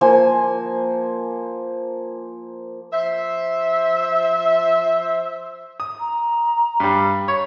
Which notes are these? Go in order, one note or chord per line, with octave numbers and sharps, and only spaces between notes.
F3 A#3 C5 G#5
F3 C5 E5
D#6
A#5
G2 G3
C#5